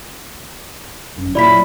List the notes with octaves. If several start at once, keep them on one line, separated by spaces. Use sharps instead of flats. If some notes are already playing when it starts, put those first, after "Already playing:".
G1 F#2
A#2 F#3 E4 D5 B5 B6